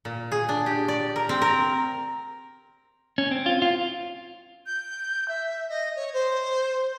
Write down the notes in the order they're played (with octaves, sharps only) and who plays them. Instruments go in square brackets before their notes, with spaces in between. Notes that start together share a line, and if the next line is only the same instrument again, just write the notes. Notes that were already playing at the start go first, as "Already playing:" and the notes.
[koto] A#2
G#4
D4
G4
D5
A#4
C4
A#4
[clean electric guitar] C#4
C4
F4
F4
[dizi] G6
E5
D#5
C#5
C5